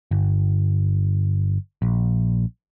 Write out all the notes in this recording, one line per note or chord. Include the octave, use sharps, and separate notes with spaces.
G1
A#1